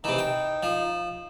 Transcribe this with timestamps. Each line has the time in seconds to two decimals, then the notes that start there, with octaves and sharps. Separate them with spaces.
0.04 C3 E3 D#4
0.19 G5
0.63 F3